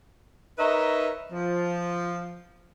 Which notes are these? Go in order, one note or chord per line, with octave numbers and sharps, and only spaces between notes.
D#4 A#4 B4 C#5 D#5 E5
F3